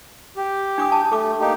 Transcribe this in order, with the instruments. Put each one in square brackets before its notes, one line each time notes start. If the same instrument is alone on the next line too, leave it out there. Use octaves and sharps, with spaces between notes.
[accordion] G4
[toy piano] D4 D6 D#6
A5
[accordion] A3 [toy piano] A4 D6
[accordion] A#3 D#4 G4